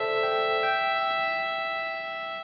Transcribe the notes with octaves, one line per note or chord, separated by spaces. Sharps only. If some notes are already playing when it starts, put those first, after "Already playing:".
Already playing: A4 C5 D5 E5
G5
G5